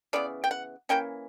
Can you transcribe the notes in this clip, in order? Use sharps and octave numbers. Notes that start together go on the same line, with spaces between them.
C#3 E3 B3 D5
G5
F#5
E3 A#3 C#4 G5